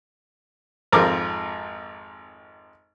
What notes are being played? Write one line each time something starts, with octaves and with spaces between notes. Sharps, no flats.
G#1 F2 A#4 D6